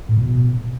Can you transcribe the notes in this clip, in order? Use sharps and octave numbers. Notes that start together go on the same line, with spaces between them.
A2
B2